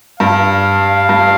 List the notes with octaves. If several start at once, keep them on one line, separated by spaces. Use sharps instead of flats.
G2 F5
G2